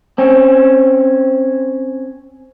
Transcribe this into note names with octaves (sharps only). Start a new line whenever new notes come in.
C4 C#4